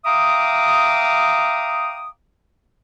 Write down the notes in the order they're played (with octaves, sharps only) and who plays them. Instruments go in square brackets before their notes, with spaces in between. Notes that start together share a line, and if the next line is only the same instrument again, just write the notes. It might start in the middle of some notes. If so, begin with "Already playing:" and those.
[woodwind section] E5 F5 G5 A#5 D6 D#6